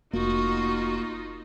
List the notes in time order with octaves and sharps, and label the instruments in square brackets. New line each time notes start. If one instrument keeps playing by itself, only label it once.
[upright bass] F1 [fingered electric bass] A#3 [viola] D#4 F4 [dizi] F#4